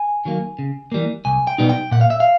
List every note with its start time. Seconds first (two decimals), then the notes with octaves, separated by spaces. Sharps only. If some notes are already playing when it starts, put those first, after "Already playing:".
Already playing: G#5
0.25 D#3 F#3 A#3
0.59 C#3
0.92 E3 G3 A#3
1.25 C2 G#5
1.47 G5
1.58 B2 G3 B3 D#4
1.69 G5
1.91 A#2 F#5
2.01 F5
2.10 E5
2.20 F5